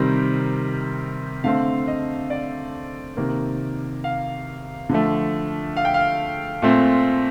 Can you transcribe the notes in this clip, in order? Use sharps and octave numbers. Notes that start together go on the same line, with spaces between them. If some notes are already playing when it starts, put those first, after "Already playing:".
Already playing: C3 D#3 G3 C4 A#4
D3 A3 C4 F5
D#5
D5
C3 D#3 A#3
F5
D3 F3 A3
F5
G5
F5
A#2 A3 C4